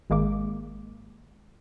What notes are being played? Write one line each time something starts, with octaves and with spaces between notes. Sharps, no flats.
G#1 G#3 A#3 D6